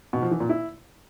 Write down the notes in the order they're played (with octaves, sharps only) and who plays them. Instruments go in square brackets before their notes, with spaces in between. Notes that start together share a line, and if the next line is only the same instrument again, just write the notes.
[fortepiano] B2
F3
E3
A#2
E4